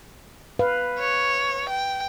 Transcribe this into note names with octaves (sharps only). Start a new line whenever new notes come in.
B4 F5
C#5
G5